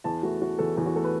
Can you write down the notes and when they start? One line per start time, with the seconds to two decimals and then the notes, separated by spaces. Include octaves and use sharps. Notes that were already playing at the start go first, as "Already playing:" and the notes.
0.04 E2 A5
0.23 A3 F#4
0.42 E3 F#4
0.59 E2 A4
0.77 E2 A4
0.86 F#4
0.96 A3 A4
1.04 B4